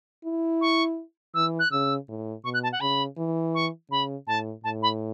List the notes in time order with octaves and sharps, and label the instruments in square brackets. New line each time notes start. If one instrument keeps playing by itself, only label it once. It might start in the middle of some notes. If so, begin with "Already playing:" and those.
[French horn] E4
[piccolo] C#6
[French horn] E3 [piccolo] E6
[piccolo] F#6
[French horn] C#3 [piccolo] E6
[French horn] A2
[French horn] B2 [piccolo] C#6
[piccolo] F#6
A5
F#5
[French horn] C#3 [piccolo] B5
[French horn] E3
[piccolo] C#6
[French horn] C#3 [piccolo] B5
[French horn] A2 [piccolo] A5
[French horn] A2 [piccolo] A5
[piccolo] B5